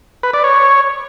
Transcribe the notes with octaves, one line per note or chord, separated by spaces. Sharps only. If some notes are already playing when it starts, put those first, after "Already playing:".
B4
D5
C#5